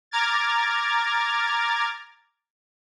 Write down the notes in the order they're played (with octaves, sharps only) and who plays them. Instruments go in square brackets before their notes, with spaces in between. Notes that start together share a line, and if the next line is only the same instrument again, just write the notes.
[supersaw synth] A#5 D6 F6 G#6 A6